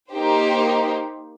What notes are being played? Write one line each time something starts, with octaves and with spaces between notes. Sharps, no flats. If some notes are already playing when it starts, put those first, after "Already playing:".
A#3 D#4 G4 C5